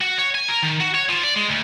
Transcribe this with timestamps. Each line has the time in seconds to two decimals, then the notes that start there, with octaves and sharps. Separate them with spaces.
0.01 F#4
0.19 C#5
0.35 G#5
0.48 A#4
0.63 D#3
0.80 F#4
0.95 C#5
1.09 F3
1.24 D5
1.36 G#3
1.49 D2